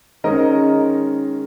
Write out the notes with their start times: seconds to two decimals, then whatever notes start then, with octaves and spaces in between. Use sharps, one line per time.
0.24 D#3 G#3 C#4 A#4 D#5